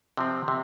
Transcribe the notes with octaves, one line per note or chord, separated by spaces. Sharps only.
C3 F3 C4
C3